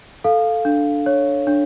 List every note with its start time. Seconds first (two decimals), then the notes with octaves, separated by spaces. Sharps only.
0.24 A4 F5
0.65 D4
1.06 C#5
1.47 D4